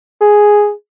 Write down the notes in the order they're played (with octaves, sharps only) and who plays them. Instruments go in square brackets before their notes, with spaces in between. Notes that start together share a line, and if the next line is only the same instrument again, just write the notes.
[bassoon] G#4